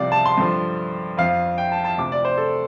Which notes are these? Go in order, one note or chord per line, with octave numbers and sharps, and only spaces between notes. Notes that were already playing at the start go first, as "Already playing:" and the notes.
Already playing: C2 C3 F3 D5 F5
A5
C6
G2 D3 F3
F2 F3 F5
G5
A5
A5
D2 C3 F3 D6
D5
C5
A4